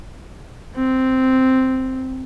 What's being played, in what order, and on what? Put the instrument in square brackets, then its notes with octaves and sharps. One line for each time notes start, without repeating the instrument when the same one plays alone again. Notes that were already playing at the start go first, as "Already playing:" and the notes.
[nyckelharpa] C4